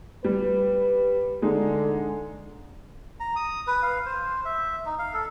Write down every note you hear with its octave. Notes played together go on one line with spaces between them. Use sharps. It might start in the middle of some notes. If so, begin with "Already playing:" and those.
G3 B4
D3 G#3 D#4
A#5
D#6
B4
F5
C5
E5
D#4
F5
A4